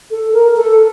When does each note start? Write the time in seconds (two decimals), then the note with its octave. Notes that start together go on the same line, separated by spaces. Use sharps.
0.11 A4
0.33 A#4
0.57 A4